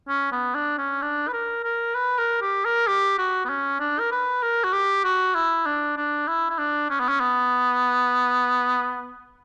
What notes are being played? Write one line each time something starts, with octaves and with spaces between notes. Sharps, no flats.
C#4
B3
D4
C#4
D4
B4
A#4
A#4
B4
A#4
G4
A#4
G4
F#4
B3
C#4
D4
A#4
B4
A#4
F#4
G4
F#4
E4
D4
D4
E4
E4
D4
C#4
B3
C#4
B3